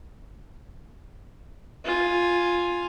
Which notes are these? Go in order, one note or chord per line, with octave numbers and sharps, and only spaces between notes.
F4 G#5